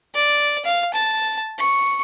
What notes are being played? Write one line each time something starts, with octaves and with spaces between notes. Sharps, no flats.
D5
F5
A5
C#6